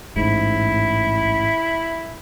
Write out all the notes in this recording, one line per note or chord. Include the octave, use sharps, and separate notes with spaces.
A1 G#2 E4